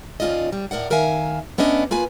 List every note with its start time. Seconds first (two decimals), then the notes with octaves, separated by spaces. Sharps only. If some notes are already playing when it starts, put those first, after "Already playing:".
0.20 D#2 C#4 F4 D5 D#5
0.52 G3
0.71 A2 A#4 D5 F#5
0.90 D#3 A#4 E5 F5 G#5
1.58 A3 B3 C#4 D4 D#5
1.91 A#3 F4 B4 G#5